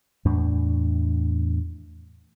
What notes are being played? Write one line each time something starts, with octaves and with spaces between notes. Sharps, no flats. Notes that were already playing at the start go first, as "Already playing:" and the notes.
E2 A2 D4